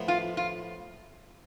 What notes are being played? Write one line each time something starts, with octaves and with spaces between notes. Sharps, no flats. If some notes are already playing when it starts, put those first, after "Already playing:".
Already playing: A2 F3 B3
F4
F4